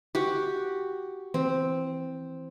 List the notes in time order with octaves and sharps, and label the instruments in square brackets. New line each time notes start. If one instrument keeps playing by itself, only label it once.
[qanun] F#4 G4
[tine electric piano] E3 [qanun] C4